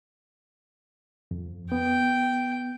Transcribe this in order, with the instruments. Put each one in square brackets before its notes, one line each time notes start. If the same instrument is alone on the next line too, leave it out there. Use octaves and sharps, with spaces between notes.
[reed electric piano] F2
[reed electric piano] B3 [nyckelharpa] G5